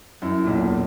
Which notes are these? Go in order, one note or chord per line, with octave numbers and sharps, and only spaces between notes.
F#2 E4
E1 B1 A#2